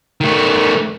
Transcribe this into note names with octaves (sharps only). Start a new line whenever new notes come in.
D#3 A3